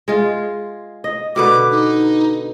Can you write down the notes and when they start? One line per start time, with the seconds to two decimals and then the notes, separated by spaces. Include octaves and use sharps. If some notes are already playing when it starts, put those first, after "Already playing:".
0.08 G#3 F4
1.04 D#5
1.36 B2 D3 B4 D6
1.71 D#4